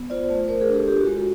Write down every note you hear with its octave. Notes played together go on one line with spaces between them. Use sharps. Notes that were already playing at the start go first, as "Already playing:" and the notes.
Already playing: B3
F4 C5 D5
A3
A3 A#4 C5
G#4 A#4
D4
G4 A4
F4 G4
F#4
G#3
F#4